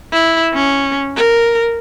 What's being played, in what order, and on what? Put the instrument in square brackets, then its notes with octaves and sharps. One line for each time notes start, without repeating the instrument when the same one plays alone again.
[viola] E4
C#4
A#4